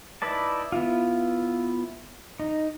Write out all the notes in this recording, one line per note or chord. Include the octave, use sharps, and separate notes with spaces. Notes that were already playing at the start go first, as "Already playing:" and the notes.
D#4 E4 B4 D5 A5
B3 E4 F4
D#4